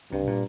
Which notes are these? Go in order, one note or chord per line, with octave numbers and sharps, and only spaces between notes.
C2 G2 C3
A#2